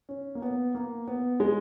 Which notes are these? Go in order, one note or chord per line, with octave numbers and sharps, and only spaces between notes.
C#4
A#3
B3
A#3
B3
G#3